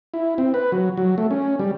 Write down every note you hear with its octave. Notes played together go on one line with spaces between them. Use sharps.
E4
C4
B4
F#3
F#3
A3
C#4
G3